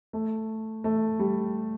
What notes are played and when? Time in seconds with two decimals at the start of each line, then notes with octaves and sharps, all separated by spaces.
0.13 A3
0.84 A3
1.19 G3